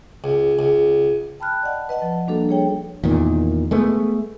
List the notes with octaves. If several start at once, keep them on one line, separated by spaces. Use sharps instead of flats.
C#2
C#2
G5 A5 B5 F6 F#6
D5 D#5 F#5 A5
B4 D#5 F#5 A5
F3
G3 A#3 D4 F#4 A4
G#4 C#5 G5
E2 A#2 D#3
G#3 A3 B3